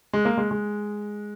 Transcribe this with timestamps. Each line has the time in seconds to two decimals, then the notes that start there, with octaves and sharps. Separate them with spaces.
0.13 G#3
0.25 A#3
0.37 G#3
0.51 G#3